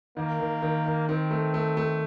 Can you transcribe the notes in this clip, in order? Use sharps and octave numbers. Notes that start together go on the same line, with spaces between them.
D#3 A#3
D#3
D#3
D#3
D#3 C4
A3
A3
A3